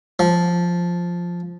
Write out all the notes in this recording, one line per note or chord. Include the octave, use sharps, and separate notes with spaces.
F3